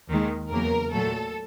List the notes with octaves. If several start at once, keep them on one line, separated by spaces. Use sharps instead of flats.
D#2 D#3 G#3
E2 C#3 F#3 A#3 A#4
A#2 F#3 A3 A4